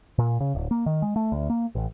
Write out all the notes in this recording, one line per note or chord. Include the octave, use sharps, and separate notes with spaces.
A#2
C#3
D1
A#3
D#3
G#3
A3
D2
A#3
A1